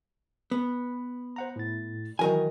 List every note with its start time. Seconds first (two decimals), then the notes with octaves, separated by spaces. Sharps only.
0.51 B3
1.36 C5 F#5 A#5
1.56 A2 A6
2.19 D#3 E3 F#3 F#4 A#4 G#5